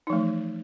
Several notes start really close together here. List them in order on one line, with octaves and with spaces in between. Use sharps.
D#4 F3 A3 E3